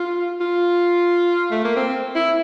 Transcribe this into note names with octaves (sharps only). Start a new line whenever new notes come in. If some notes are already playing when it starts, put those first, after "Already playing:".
Already playing: F4
F4
A3
A#3
C4
E4